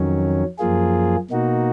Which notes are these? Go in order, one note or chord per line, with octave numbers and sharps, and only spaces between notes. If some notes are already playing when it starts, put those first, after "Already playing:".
Already playing: F2 D#3 F#3 C#4
F#2 F3 A#3 F4 G#4
B2 A#3 D#4 F#4